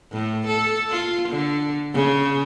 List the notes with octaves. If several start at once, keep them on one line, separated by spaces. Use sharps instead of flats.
A2
A4
F4
D3
C#3